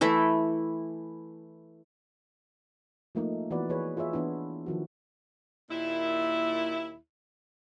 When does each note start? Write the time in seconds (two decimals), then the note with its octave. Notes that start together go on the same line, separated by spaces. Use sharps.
0.01 E3 A3 E4
3.15 F3 A3 A#3 D#4
3.51 E3 B3 F#4 B4 D5
3.69 E3 G#4 B4 C#5
3.97 F4 G#4 C#5 E5
4.13 E3 B3 D4 E4
4.66 D#3 F3 F#4
5.70 D#2 A#2 E4